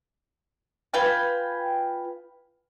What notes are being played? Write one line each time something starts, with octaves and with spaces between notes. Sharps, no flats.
F4 B4 G5 G#5